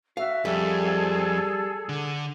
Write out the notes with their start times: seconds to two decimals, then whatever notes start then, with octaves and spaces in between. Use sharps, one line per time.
0.17 F#4 E5 F5
0.45 F2 G3 G#4 A4 E5
1.89 D3